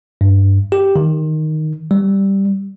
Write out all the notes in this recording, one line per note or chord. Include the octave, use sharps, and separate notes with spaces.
G2
G4
D#3
G3